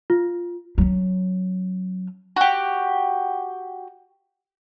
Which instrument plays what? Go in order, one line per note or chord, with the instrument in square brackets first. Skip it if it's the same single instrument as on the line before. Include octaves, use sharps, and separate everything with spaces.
[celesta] F4
[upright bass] F#3 C#4
[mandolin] F#4 G4